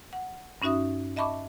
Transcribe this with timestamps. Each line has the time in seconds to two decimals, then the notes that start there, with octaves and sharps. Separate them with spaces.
0.13 F#5
0.62 G2 C#4 D#4 F#4 E5 D#6
1.16 D#5 E5 A5 B5 C#6 D6